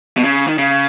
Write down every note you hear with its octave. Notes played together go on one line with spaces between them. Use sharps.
B2
C#3
D#3
C#3